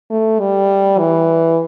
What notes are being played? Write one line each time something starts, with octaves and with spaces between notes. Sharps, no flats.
A3
G3
E3